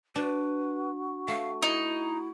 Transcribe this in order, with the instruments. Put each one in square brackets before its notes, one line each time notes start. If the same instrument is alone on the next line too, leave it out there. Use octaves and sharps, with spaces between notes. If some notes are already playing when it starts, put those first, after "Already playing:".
[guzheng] D4 [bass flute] F#4 [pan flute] B4
[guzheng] A3 [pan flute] F5
[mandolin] D#4 [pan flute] E4